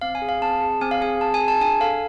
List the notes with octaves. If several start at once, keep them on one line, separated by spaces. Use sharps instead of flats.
C4 F5
G#5
G#4
F5
C4 A5
G#4
C4 G#5
F5
G#4 G#5
C4 A5
G#5
G#4
A5
D4 G#5
A4 F5